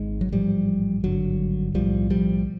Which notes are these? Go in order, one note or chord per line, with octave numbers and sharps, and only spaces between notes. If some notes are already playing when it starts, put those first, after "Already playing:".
Already playing: G#1 G#2 G#3
F#3
A1 G#2 F3 G3
G#1 G2 D3 F#3
B1 A2 F3 G3
F3 G3